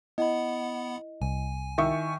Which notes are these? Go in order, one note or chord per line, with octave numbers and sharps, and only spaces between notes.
B3 E4 D#5 F#5 B5
C2 G#5
D#3 E4 E5 C#6